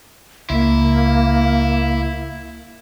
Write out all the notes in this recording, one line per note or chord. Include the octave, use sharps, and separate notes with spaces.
C#2 A#3 E4